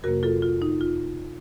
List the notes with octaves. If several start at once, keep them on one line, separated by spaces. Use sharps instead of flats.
F2 C3 F#3 A#3 F#4 A#4
F4 A4
F4
D#4
F4